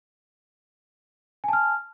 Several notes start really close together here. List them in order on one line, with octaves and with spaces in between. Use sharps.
G#5 A5 F6